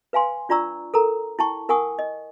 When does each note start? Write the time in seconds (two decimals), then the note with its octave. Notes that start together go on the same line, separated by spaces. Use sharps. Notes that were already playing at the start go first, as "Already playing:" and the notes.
0.13 B4 F5 G#5 C6
0.49 D4 F4 D5 A#5 C#6 E6
0.94 A4 A#4 A#5
1.39 E4 G5 A5 C#6
1.69 E4 A#4 F#5 G#5 C#6 D#6
1.99 D#5